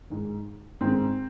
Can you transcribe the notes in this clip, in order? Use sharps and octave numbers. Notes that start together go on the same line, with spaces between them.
G#2 D#3
G#2 D#3 C4